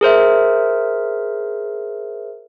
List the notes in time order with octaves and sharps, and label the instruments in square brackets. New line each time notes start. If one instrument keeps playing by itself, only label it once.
[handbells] G#4 A#4 C5 E5